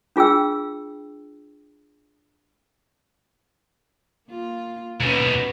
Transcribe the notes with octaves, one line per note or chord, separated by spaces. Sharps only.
D4 F4 G#4 G5 E6
A#3 F4
D#2 B2 C#4 F#4 B4